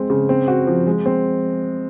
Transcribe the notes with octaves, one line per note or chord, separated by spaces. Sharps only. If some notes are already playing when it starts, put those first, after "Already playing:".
Already playing: G#3 C4
C#3
C4
F#4
F3
G#3
C4